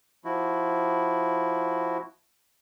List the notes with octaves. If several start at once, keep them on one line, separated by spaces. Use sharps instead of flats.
F3 E4 F#4